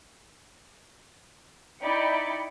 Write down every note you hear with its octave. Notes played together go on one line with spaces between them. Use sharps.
D#4 E4 D5 G5 B5 C#7